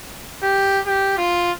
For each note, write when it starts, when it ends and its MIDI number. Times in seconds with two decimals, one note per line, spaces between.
0.43 0.80 67
0.86 1.13 67
1.18 1.51 65